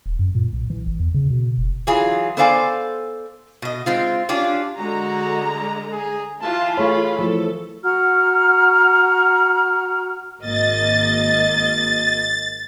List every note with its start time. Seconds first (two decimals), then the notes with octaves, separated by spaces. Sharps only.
0.06 D#1
0.19 F#2
0.35 A#2
0.53 B1
0.70 E3
0.86 G#1
1.00 E2
1.14 C#3
1.30 B2
1.58 F1
1.87 E3 F#3 F4 G#4
2.37 B3 A4 C5 D5 F5 G#5
3.62 B2 D#5
3.86 G#3 C4 F4
4.29 C#4 D4 F4 G4
4.78 D3 G#3 F#4 A#5
5.92 G#4
6.41 E3 F4 A5
6.77 A3 G#4 C#5 B5
7.19 E3 F3 A3 A4
7.82 F#4 A#5 F6
10.41 G#1 A#3 D#5 A6